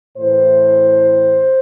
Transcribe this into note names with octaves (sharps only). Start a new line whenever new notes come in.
A2 E3 C5